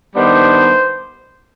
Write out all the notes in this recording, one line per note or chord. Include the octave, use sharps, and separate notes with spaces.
D#3 G3 B3 D4 C5